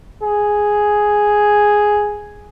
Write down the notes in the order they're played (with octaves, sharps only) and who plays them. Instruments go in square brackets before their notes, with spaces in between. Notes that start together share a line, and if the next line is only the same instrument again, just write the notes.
[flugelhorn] G#4